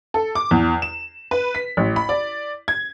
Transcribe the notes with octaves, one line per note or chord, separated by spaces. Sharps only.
A4
D6
E2
E7
B4
B6
A1
B5
D5
G#6